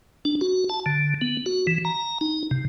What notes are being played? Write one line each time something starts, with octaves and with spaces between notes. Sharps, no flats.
D4
F#4
A5
D3
B3
F#4
E3
A#5
D#4
C3